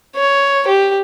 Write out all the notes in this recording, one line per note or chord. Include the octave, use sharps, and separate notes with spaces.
C#5
G4